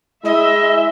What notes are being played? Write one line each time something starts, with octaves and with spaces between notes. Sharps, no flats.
G#3 E4 D#5 E5